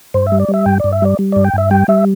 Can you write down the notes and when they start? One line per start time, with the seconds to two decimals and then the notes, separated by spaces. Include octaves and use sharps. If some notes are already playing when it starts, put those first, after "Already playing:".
0.14 G2 C5
0.27 E5
0.32 G3
0.40 D5
0.49 G3
0.54 E5
0.66 G2 G5
0.80 G2 D5
0.93 E5
1.02 G3 D5
1.19 G3
1.32 G2 D5
1.44 G5
1.54 G2 E5
1.71 G3 G5
1.88 G3 E5